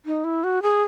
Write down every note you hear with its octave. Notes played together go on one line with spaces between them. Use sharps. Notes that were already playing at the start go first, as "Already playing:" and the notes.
D#4
E4
F#4
G#4